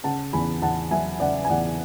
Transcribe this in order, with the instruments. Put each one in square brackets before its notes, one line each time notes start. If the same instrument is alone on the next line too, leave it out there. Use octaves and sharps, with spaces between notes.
[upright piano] C#3 F#5 A5
E2 G#5 B5
E2 F#5 A5
F#3 E5 G#5
C#3 D5 F#5
G#5
E2 D5 F#5